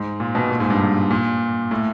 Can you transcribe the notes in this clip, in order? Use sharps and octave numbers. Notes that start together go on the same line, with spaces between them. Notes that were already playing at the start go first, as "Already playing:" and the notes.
Already playing: G#2
A#2
B2
A#2
G#2
G2
G#2
A#2
A2